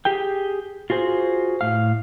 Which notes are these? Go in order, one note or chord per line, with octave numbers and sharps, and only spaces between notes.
G4 G#4 G5
F4 F#4 G#4 C5
A2 F5